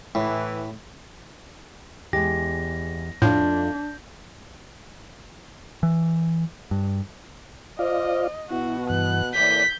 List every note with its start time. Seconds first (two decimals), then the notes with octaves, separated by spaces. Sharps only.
0.15 A2 E3
2.13 E2 G#3 G4 A#6
3.22 F2 A2 A3 D4 F4 G6
5.83 E3
6.71 G2
7.79 F4 C5 D5 D#5 F5
8.51 B2 B3 E4 F#4
8.90 G2 E3 F#6
9.35 A2 E3 A#3 D5 G6 B6